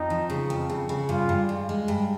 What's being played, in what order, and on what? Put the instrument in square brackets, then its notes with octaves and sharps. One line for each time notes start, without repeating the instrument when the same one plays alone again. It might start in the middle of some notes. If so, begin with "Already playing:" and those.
Already playing: [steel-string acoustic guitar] F2 [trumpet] D#4
[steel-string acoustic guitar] F3
C#3
F2
C#3
C#3
[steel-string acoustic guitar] G2 [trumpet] F4
[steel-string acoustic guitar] G2
G#3
G#3
G2